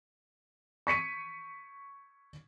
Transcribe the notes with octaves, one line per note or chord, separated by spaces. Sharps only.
C#6 B6 C#7 D#7